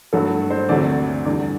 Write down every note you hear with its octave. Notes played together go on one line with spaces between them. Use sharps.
G2 F#3 A3 A4
C5
D2 C3 F#3 A3 D5
E2 D3 G3 D5